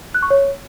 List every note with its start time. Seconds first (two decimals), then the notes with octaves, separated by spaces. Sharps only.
0.14 F#6
0.22 C#6
0.30 C#5